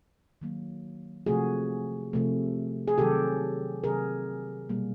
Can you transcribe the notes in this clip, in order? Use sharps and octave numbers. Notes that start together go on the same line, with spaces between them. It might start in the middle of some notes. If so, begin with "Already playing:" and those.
D#3 F#3 A#3
C3 F3 A3 F#4 G#4
C3 F3 A3
G#4
C3 D#3 F#3 G4 A4
C3 D#3 F#3 G#4 A#4
B2 G3 A#3